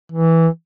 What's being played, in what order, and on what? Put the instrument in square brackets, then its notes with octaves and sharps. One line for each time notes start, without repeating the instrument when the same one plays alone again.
[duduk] E3